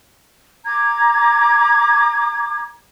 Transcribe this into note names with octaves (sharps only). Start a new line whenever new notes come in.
A#5 D6 G#6